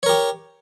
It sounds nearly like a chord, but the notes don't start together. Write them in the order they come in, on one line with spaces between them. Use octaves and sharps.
C#5 A#4 G4